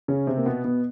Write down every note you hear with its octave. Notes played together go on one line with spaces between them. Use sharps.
C#3 C#4
C3 C4
A#3
B2 B3
B2 B3